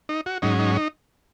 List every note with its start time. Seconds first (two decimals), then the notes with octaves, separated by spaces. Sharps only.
0.09 D#4
0.26 F#4
0.42 G#2 F#3 C#4 D#4
0.59 D#4
0.76 D#4